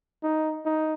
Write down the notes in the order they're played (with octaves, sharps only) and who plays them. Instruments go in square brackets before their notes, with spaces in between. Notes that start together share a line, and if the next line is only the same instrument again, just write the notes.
[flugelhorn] D#4
D#4